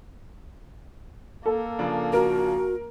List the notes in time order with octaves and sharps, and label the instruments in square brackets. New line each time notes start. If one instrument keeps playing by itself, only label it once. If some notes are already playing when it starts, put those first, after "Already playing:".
[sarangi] A#3 [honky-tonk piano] A4
[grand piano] C#3 F3 D4
[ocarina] F#4 [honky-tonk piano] A#4